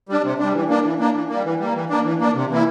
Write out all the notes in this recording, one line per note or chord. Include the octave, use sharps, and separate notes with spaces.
G3 D4
C3
G3 D4
E3
A#3 D4
E3
A#3 D4
E3
G3 A#3
E3
G3 A#3
E3
A#3 D4
E3
A#3 D4
C3
E3 A#3 E4